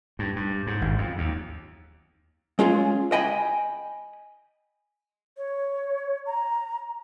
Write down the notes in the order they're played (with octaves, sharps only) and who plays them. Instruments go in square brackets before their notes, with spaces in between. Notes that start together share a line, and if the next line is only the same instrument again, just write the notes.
[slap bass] G2
G2
G#2
G#1
F2
D#2
[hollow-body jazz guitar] G#3 C#4 F4 G#4
D#5 G5 G#5 B5
[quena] C#5
A#5